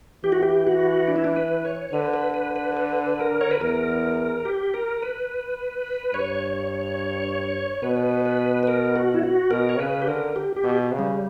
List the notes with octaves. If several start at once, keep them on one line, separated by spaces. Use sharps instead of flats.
E3 G4
F#4
G4
F#4
D4
E4
D4
B4
C#5
D3 B4
B4
B4
B4
B4
A#4
C#5
B4
E2 A#4
G4
A#4
B4
G2 C#5
B2 B4
B4
B4
A#4
F#4
E4
F#4
B2 A#4
C#5
C#3 B4
G4
D3 A#4
G4
G4
B2
C#3
G3